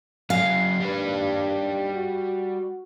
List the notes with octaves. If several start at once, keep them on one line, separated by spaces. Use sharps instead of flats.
F#3 G#4 F5
D#2 G3 D4 B4
F#4